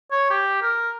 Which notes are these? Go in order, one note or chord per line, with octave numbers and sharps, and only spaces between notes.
C#5
G4
A#4